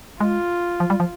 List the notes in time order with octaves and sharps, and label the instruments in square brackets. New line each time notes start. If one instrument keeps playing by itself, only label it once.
[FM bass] G#3 [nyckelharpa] F4
[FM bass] F3
G3
F3